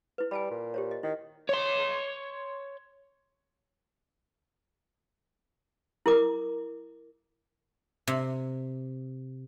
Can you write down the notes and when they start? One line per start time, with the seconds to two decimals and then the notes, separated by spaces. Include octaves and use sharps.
0.18 E4 B4
0.31 G3 G#5 A5 B5
0.51 A#2
0.74 G4 C5 C#5
0.91 D#5
1.03 D#3 E4
1.49 C#5 C6
6.06 E4 A#4 D6
8.07 C3